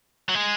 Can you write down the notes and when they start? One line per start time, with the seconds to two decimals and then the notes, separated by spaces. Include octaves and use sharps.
0.29 F#3
0.35 G#3